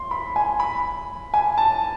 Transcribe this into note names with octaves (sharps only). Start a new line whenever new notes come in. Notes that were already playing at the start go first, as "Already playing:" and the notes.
Already playing: C6
B5
G#5
B5
G#5
A5